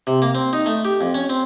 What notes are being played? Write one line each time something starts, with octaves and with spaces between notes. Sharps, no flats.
C3
A#3
C4
D#4
A3
G4
F2
C#4
C4